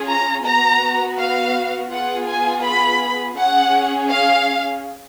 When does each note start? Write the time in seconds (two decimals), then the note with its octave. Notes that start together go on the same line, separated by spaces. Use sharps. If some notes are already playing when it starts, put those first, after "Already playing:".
Already playing: C#4 F4 G#4
0.08 A#5
0.45 B3 F#4 A#5
1.18 F5
1.91 B3 F4 G#4 F#5
2.28 G#5
2.65 B5
3.36 C#4 G#4 F#5
4.09 F5